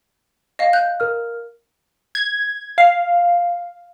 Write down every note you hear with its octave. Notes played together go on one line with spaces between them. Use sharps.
D#5 F5
F#6 G6
A#4 F6
G#6
F5